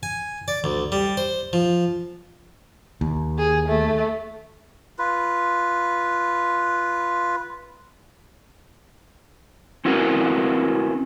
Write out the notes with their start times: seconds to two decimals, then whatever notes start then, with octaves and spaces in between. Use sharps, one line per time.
0.03 G#5
0.48 D5
0.64 D2
0.92 G3
1.17 C5
1.53 F3
3.01 D#2
3.38 G#4
3.69 A3
4.99 F4 B4
9.85 C4 C#4 E4 F#4 A#4 B4